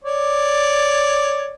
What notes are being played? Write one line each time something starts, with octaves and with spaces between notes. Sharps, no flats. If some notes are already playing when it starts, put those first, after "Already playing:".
C#5 D5